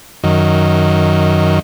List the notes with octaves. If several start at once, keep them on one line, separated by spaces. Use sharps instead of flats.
F#2 D#3